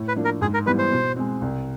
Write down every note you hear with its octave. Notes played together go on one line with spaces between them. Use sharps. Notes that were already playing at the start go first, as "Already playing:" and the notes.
Already playing: A2
B4
F3 A#3 D4
A#4
G#2 G#4
A#4
E3 G3 B3 B4
C5
B2
G#3 C4
C2